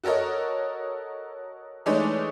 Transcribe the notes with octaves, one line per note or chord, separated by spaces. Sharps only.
F#4 A4 A#4 C#5 D#5
E3 G#3 A3 D4 D#4 C#5